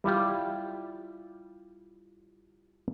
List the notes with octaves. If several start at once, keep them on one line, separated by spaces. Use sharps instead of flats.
G3 E4 F4 G4